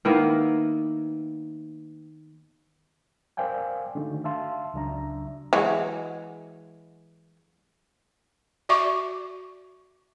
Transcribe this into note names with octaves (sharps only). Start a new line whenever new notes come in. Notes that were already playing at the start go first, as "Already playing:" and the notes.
D#3 A#3 B3 E4
A#4 C5 D5 F5 G5 G#5
D3 D#3 A3 D4 D#4 F#4
E5 F5 A5 C6
C#2 C#3 F#3 D4 E5 A#5
E3 F#3 G#3
F#4 D5 E5 C#6 D6